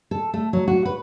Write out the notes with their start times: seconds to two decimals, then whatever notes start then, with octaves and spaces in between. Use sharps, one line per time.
0.11 A4
0.34 A3
0.53 F#3
0.68 F#4
0.85 B4